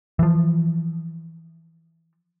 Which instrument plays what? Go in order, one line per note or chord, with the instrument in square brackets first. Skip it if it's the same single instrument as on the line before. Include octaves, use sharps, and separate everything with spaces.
[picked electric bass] E3 F3